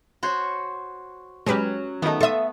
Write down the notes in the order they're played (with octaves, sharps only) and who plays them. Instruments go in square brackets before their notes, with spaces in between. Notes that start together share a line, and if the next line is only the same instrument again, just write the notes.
[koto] F#4 C5 C#5
[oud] F#3 C#4 [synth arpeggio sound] G#3 G4 B4
[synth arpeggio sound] D#3 D#4 [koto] A3 B3
[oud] A4 E5 [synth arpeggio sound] C6 D#6